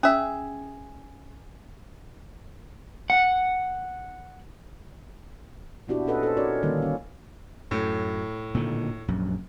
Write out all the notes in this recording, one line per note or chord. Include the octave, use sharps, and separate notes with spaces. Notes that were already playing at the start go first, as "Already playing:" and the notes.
C#4 G#4 E5
F#5
A#2 B3 D4 E4 F#4 G4
C#4 A4 B4 D#5 F#5
A4 C5
C#4 D#4 F#4 A#4 C#5 D5
D3 D#3 G3 A#3 C#4
C#4
F#2 A2
A#2 D3 D#3
A#1 F#2